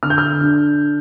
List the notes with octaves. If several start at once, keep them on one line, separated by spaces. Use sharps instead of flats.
D3 F6
G6
F6
D4